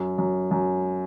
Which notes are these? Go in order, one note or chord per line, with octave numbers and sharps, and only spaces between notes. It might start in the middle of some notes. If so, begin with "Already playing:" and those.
Already playing: F#2
F#2
F#2